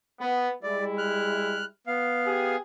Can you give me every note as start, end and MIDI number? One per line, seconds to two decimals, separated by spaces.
0.20 0.49 59
0.63 1.66 55
0.63 1.66 56
0.63 1.66 64
0.63 0.84 74
0.98 1.65 89
0.98 1.65 90
1.87 2.56 59
1.87 2.56 77
2.26 2.57 67
2.26 2.57 68